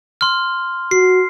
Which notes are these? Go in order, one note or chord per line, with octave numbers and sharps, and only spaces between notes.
C6 F6
F#4 C7